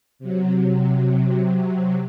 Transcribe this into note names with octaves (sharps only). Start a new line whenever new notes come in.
C3 F#3